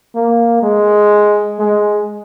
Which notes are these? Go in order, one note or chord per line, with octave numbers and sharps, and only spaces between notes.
A#3
G#3
G#3